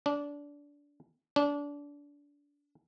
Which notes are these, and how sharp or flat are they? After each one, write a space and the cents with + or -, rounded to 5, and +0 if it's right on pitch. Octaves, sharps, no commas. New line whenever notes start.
D4 -20
D4 -25